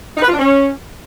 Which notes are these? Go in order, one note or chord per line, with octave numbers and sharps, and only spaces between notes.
D#4
B4
F4
D4
C#4